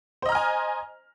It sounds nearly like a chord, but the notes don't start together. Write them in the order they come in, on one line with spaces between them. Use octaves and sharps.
C5 D#5 A#5 F6 G#5